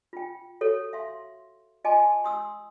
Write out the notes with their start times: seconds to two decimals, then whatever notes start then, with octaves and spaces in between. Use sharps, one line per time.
0.13 F4 G5
0.61 F#4 A4 C#5
0.93 E5 F5 C6
1.84 F4 D#5 G#5 A5 C6 D6
2.24 C6 D#6 E6